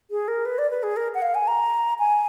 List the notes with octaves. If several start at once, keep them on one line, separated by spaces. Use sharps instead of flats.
G#4
A#4
B4
D5
B4
G#4
A#4
F#5
F5
G#5
A#5
G#5